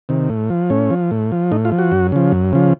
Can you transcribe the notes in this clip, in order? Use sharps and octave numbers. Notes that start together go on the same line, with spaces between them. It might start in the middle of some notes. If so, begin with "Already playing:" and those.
C3 D#3
A2
F3
A2 C#4
F3
A2
F3
A2 D#4
F4
F3
F#4
F#2
C#3 F3
F#2
C#3 F3